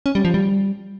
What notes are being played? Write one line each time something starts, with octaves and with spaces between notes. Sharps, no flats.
C#4
G3
F3
G3